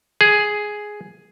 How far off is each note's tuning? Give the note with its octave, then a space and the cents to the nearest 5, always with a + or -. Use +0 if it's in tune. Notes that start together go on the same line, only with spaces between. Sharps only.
G#4 +5